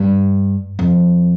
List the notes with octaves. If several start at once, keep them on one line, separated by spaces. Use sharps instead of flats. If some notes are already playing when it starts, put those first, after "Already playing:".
Already playing: G2
F2